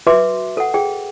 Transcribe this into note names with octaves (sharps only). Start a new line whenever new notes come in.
F#4 B4 E5 C6 D6
A4 F#5
G#4 G5